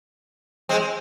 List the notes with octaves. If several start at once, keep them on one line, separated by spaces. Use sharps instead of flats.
G#3 C4